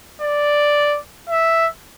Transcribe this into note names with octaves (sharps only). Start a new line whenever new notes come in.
D5
E5